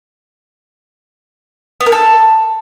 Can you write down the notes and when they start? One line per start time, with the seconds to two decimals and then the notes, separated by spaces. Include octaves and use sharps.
1.81 B3
1.86 A#4
1.92 A4